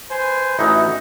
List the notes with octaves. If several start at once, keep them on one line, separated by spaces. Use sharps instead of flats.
B4 C5 G#5
A1 E3 D#4 F#4 E5